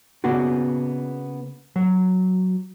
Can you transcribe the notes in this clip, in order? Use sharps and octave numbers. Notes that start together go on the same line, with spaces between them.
C#3 A#3 B3 D4 F#4
F#3